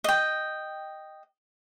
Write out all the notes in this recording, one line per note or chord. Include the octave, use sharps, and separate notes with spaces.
D#5 G5